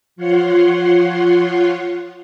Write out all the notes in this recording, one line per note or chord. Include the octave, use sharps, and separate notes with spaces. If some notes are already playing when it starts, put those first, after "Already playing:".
F3 F4 C#5 F#5 C6